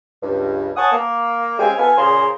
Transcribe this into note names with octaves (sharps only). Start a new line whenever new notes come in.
C#2 G2
C#5 F#5 G#5 A5 C#6 D#6
A#3
G#3 C4 C#4 G4 F5 G#5
B3 F4 A4 B4 G#5
A#2 C#3 G#4 A#4 C5 C6